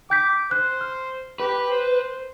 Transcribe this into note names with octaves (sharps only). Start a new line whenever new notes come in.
G5 D6 G6 B6
C5 F#6
F6
G4 B4
C5